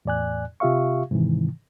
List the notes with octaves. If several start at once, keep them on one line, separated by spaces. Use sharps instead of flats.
E2 A2 D5 G#5 F#6
C3 F4 G4 E5 F5 C#6
G#2 C3 D#3 E3